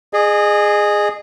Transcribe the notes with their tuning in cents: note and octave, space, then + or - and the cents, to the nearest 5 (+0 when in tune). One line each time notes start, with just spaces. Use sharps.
G#4 +0 D#5 -35